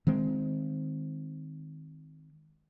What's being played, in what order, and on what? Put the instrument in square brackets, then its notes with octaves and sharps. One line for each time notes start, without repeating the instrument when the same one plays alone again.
[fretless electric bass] D#3 G#3 C4